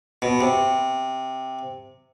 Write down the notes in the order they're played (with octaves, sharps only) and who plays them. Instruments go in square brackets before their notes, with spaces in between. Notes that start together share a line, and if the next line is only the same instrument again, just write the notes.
[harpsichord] B2
C3